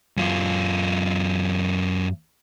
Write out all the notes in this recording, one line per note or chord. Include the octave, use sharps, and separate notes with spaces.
F#2 F4